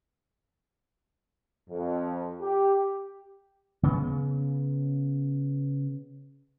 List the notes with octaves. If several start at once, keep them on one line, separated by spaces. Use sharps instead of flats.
F2
G4
C#3 B3